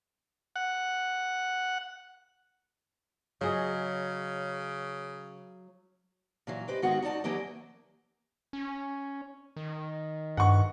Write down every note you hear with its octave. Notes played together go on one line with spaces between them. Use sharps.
F#5
C#3 F#3 G#4 D#5
A#2 E3 F#3
G4 B4 C5 D#5
G#2 D#3 G#3 A#3 B3 F#4
D#4 F#4 D5 A5
E3 F#3 A#3 G4 D#5
C#4
D#3
G2 F#5 C#6